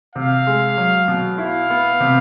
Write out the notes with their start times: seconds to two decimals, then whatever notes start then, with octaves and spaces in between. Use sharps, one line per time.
0.15 C3 F5
0.47 G#3
0.77 F#3
1.08 B2
1.38 E4 F5
1.70 B3
2.00 C3